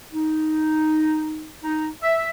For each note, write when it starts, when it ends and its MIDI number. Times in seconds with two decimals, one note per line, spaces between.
0.12 1.53 63
1.63 1.87 63
2.02 2.29 76